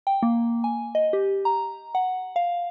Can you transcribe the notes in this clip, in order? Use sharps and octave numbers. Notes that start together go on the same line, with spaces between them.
G5
A#3
G#5
D#5
G4
A#5
F#5
F5